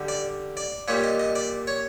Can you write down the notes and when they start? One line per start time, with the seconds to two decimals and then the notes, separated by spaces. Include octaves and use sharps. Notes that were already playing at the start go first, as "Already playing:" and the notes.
Already playing: D3 G3
0.08 D5
0.57 D5
0.88 A#2 G3 C#5
1.04 D#5
1.19 D#5
1.35 D5
1.67 C#5